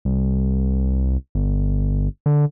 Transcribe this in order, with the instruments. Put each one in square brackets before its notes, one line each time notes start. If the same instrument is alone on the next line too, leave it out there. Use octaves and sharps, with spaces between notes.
[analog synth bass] C2
G1
D3